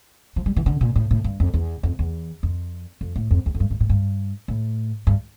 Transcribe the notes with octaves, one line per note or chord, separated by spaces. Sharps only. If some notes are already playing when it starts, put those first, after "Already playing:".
F3
G3
E3
D3
A#2
A2
A2
G2
F2
E2
F2
E2
F2
F2
A2
F2
E2
F2
G2
G2
A2
G2
A2
G2